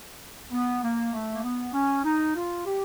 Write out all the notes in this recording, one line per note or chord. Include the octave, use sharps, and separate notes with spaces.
B3
A#3
A3
A#3
B3
C#4
D#4
F4
G4